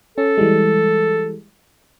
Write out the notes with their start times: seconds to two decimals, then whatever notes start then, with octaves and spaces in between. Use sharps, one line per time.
0.18 C#4 A4
0.38 E3 G3 G#3